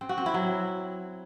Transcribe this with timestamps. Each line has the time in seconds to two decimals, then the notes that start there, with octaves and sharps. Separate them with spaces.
0.01 C4
0.09 F#4
0.18 C4
0.26 E4
0.34 F#3